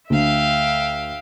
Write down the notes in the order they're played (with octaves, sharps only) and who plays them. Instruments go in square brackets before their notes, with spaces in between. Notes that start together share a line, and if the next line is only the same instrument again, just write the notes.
[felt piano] D2 [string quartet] E5 F5 G5